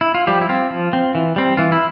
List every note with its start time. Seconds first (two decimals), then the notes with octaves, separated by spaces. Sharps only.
0.01 E4
0.14 F4
0.27 F3 G3 G4
0.41 E4
0.49 C4 F4
0.70 F3
0.93 C4
1.15 E3
1.36 G3 C4
1.57 E3 F4
1.72 E4